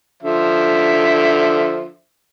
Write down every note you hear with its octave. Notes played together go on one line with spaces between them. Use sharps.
D3 F3 E5